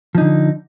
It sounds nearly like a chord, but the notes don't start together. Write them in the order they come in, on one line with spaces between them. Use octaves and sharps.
F3 D#4 D3